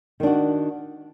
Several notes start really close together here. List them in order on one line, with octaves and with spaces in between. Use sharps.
D#3 D4 F#4